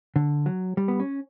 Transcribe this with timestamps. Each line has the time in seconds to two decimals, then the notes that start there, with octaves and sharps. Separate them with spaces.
0.16 D3
0.46 F#3
0.77 G3
0.88 B3
1.00 C#4